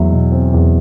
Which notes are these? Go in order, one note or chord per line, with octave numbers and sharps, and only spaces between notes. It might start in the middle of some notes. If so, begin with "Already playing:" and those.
Already playing: E2 F#3 E5
B2
C4
E2